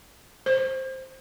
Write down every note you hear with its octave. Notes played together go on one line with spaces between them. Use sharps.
C5